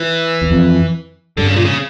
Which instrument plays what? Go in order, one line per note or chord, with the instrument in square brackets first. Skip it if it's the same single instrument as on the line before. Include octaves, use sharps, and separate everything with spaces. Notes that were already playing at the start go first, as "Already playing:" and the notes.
Already playing: [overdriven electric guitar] E3
[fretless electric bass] E2
F2
[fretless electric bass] G2 [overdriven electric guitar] D3
[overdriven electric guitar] C#3
A#2
C#3